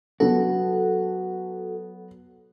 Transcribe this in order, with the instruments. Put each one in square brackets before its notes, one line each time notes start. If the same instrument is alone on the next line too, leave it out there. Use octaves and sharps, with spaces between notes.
[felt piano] F#3 B3 [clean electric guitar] F#4 [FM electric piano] A4